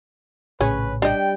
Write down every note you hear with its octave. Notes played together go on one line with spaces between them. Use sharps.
A#1 A2 C#3 C#4 G#4 B4
G3 D4 D#5 G5